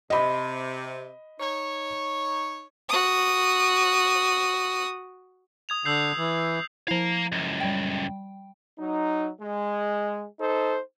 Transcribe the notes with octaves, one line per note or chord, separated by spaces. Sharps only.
C3 D#5 B5
D#4 C#5
F#4 D#6
D#6 G#6 F7
D3 E6 G6 C7
E3
F3 E4 F5 A#5
C#2 F#2
G3 G5
F#3 D#4
G#3
D#4 A4 C5